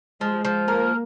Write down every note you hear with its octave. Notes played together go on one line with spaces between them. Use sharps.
F3 G#3
F3
A#3 A#4